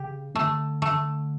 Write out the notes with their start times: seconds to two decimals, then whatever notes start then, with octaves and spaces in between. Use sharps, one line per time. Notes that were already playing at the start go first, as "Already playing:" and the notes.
Already playing: C#3 G4
0.35 D3 A3
0.82 A3